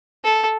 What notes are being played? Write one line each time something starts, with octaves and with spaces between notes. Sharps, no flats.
A4